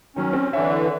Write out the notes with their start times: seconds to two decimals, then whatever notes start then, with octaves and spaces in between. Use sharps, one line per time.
0.16 D#3 F#3 C#4
0.33 C4
0.53 D3 E3 C#5 E5